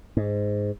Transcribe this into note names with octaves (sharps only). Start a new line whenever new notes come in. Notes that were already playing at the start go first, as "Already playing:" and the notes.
G#2